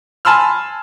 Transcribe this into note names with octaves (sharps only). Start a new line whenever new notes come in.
G#5 A5 B5 C6 E6 F6